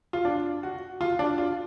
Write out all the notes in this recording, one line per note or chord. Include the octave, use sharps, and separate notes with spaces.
F4
D4
F#4
F4
D4
F4